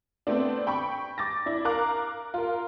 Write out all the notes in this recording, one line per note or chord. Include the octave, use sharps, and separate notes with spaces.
A3 B3 C4 D4
G5 B5 C#6
D6 A6 A#6
D4 E4
A#4 F5 A#5 D6 F#6
F4 A#4